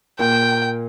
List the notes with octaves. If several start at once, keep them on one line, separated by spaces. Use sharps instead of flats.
A#2 A#3 G5